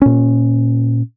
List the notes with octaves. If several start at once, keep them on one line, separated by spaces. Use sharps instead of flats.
A#2 C#4